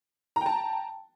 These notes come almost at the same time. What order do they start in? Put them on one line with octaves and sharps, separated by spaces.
A#5 G5 A5